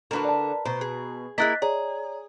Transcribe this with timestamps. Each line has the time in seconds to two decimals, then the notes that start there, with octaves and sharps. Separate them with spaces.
0.11 D3 D4 F#4 A#4 B4
0.25 D5 A5
0.65 B2 C5 A#5
0.81 G#4
1.38 A#3 E4 G#4 D#5 F#6 A6 B6
1.62 G#4 C#5 D5 A#5